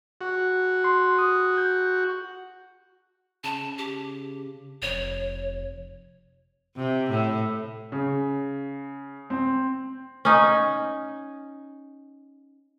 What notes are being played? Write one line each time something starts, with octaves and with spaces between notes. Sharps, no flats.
F#4
C6
D#6
G6
C#3 A5
G4
F1 C#5
C3
A2
C#3
C4
C#4 D#4